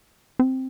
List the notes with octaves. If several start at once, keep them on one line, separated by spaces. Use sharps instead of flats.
C4